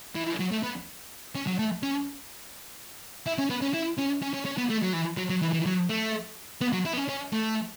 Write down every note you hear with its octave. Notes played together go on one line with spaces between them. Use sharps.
E3
F#3
A3
B3
C#4
F#3
A3
C#4
E4
C#4
B3
C#4
E4
C#4
C#4
C#4
C#4
B3
A3
F#3
E3
F#3
F#3
E3
E3
F#3
A3
B3
F#3
E4
B3
C#4
C#4
A3